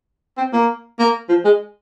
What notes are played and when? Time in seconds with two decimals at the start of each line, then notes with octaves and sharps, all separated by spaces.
0.38 C4
0.53 A#3
0.99 A#3
1.29 F3
1.45 G#3